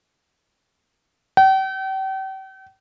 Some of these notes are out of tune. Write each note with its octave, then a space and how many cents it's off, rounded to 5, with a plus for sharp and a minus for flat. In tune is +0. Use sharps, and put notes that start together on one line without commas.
G5 -40